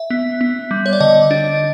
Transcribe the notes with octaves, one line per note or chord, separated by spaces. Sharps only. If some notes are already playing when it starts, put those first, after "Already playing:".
Already playing: E5
B3
B3
G3
C#5
D5
D3 D#5
D4